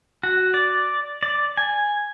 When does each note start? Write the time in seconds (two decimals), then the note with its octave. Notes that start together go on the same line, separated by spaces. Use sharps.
0.23 F#4
0.54 D5
1.23 D5
1.57 G#5